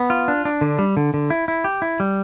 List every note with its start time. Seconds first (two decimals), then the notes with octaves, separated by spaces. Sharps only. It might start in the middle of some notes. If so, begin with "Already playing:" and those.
Already playing: B3
0.10 F4
0.28 D4
0.45 D4
0.61 D3
0.79 G3
0.97 D3
1.14 D3
1.30 E4
1.48 E4
1.64 G4
1.82 E4
2.00 G3